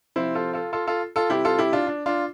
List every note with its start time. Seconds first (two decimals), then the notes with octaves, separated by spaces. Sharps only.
0.16 C3 F3 C4 E4
0.35 F4 A4
0.53 F4 A4
0.73 F4 A4
0.87 F4 A4
1.16 F4 A4
1.30 C3 G3 C4 E4 G4
1.45 F4 A4
1.59 E4 G4
1.73 D4 F4
1.87 D4
2.06 D4 F4